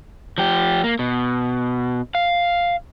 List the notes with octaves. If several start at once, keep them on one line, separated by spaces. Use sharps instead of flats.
F3 G4
A#3
B2
F5